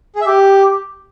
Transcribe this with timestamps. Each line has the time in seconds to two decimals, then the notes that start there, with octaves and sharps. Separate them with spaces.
0.16 G#4
0.21 E5
0.26 G4